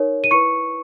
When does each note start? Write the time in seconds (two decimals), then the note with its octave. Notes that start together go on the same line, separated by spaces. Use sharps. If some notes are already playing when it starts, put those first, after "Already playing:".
Already playing: D#4 A#4 C#5
0.24 D#7
0.31 E4 B4 C#6 C#7